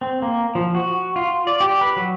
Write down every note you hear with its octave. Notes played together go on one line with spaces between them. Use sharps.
C4
A#3
F3
F#4
F4
D5
G4
B4
F#3